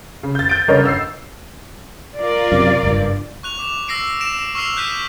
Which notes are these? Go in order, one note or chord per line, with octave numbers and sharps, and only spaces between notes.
C#3
G6 A6
G6 D7
G1 C#3 A#4 C#5 D#5
E6 C7
F4 A#4 D5
F#2 C3
F#1 G2
C#6 F#6 F7
D6 F7
E6 A#6 C7 D7
A#6 D7 E7
C#6 E6 F6 C7 F7
D#6 F#6 G6 B6 C7 D#7